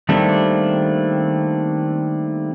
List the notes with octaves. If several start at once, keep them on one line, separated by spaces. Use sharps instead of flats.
D#3 G3 A3 A#3 C4 D4